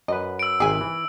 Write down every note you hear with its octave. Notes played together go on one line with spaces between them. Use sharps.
F#2 B4 D#5
E6 D7
G#1 C3 G#4 E5 G#5
E3